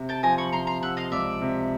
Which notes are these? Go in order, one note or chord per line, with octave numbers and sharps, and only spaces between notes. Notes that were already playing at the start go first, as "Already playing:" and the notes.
Already playing: C3
G5 A5
F3 G#5 A#5
B5 C#6
C3 A#5 C6
A#5 C6
C3 E5 F#5
D#5 F5
C#2 D5 E5
C3